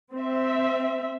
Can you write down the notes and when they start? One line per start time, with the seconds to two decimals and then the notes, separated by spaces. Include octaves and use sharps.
0.16 C4 E5